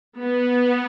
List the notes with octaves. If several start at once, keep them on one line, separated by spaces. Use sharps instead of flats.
B3